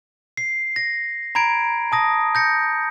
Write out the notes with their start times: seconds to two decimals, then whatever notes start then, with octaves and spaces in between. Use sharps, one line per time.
0.37 C7
0.76 A#6
1.35 A#5 B5 G#6 D7
1.92 A5 D#6 A#6
2.35 G6 A#6 C#7